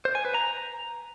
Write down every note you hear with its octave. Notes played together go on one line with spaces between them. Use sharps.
C5
G#5
B4
A#5